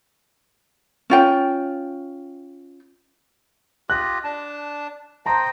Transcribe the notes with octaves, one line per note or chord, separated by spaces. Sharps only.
C#4 F4 G5
F4 G4 D#5 F#6
D4 A5
C5 D#5 G5 A5 A#5 C6